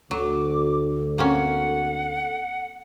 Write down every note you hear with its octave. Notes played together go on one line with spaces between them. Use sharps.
D2 F#3 A4 D6
A#3 C4 C#4 F#5